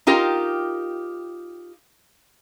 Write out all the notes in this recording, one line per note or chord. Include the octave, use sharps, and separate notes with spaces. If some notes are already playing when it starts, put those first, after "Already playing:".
D#4 F4 G4 A#4